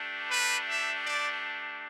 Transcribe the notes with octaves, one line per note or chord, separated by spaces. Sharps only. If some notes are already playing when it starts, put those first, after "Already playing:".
Already playing: A3 D4 G4
B4
E5
D5